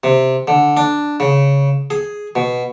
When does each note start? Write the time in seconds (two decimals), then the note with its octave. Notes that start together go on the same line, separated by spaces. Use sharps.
0.04 C3
0.48 D3
0.77 D4
1.20 C#3
1.90 G#4
2.36 B2